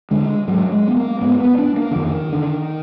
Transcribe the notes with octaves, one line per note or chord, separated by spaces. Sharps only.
D3 G#3
G#2 F#3
G#3
B3
A#3
G#2 B3
B3
D4
A#3
D3
F2 D#3
D3